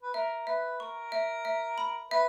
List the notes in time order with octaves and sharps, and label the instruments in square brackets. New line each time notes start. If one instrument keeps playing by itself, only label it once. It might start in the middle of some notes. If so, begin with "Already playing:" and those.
[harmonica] B4
[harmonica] A#4 [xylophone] E5
[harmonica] B4 [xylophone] E5
[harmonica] A#4 [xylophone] C#6
[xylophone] E5
E5
B5
[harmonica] B4 [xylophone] E5